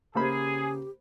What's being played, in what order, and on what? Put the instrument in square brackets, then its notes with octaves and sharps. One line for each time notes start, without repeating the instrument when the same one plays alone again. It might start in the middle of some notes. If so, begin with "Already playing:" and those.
[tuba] C#3 [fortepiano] A#3 C5 B5 [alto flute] G4 [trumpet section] G#4